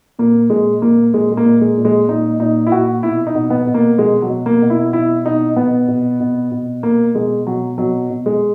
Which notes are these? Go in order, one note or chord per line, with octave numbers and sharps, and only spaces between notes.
A#2 A#3
A#2 G#3
A#2 A#3
A#2 G#3
G#3
A#3
A#2
G#3
A#2
G#3
A#2 D#4
A#2 D#4
E4
A#2 F#4
B2 E4
D#4
B2
B3
B2
A#3
B2 G#3
F#3
B2
A#3
B2
E4
B2 E4
B2 D#4
B2 B3
B2
B2
B2
B2 A#3
B2 G#3
B2 F#3
B2 F#3
B2
G#3